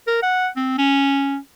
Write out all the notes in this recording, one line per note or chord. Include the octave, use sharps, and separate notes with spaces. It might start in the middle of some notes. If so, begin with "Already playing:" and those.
A#4
F#5
C4
C#4